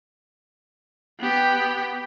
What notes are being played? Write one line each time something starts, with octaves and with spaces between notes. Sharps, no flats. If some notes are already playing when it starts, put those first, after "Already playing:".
B3 G4